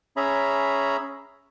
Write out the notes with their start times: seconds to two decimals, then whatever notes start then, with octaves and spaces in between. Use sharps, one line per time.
0.17 C#4 G#4 C#5 E5 A#5 B5